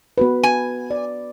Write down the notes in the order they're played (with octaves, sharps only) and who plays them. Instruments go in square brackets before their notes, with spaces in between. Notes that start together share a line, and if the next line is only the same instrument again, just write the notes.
[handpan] B3 F#4 B4
[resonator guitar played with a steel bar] G#5
[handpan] D5